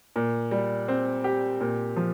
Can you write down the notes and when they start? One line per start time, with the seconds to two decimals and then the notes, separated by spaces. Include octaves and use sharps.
0.16 A#2
0.51 G3
0.88 C4
1.24 G4
1.61 A#2
1.96 F3